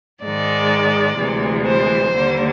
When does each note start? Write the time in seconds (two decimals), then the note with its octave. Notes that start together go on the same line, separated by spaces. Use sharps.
0.23 G#2 D#3 G#3 D5
1.18 D2 C3 E3 G#3
1.66 C5
2.14 D#2 D3 G3